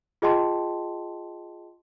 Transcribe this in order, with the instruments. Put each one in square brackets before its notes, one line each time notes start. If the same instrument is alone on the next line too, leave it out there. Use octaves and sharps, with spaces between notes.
[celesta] F4 G#4 D#5 G5 A5 C6